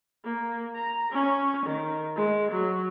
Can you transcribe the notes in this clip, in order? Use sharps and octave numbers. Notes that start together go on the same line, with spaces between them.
A#3
A#5
C#4
D#3
G#3
F#3